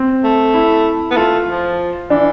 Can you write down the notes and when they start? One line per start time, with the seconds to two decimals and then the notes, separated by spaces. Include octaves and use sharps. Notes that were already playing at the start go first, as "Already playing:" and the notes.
Already playing: C4
0.24 A3
0.54 E4
1.11 B3
1.16 A3 F4
1.48 F3
2.10 E3 D4